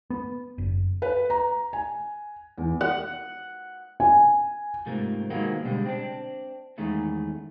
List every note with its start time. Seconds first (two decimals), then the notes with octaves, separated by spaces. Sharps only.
0.10 B3
0.58 F#1
1.02 B4
1.30 A#5
1.73 G#5
2.58 E2
2.81 F#5
4.00 G#5
4.86 G#2 C3 F3 A3 A#3
5.30 D#3 F3 F#3 G#3 A#3 B3
5.65 B2 D3 G3 G#3
5.85 C4 D4
6.78 E2 D#3 G#3 A3 C#4